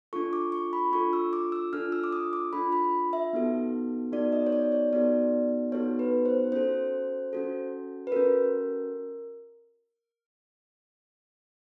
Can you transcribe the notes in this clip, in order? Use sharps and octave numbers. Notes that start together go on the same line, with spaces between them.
D4 F4 A4 C#6
D6
C#6
B5
D4 F4 A4 C#6
E6
D6
E6
D4 F4 A4 F6
E6
D6
D#6
D6
D4 F4 A4 B5
B5
E5
B3 D#4 F#4 A4
B3 D#4 F#4 A4 D5
D#5
C#5
D5
C#5
B3 D#4 F#4 A4 D5
B3 D#4 F#4 A4 C#5
B4
C5
C#4 F#4 A4 C5
C#4 F#4 A4
B4
C#4 F#4 A4 A#4